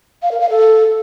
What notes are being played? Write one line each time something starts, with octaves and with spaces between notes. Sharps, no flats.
F5
A#4
F5
A4